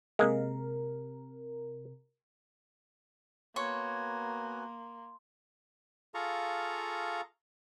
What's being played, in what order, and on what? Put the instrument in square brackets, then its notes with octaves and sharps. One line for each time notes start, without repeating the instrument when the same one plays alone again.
[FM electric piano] C3 A#4 [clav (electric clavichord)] G#3 A#3
[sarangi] A#3 [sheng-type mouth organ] B3 F#4 G#5 [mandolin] C#5 [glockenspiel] C6
[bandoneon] F4 G#4 A4 F5 A#5 C#6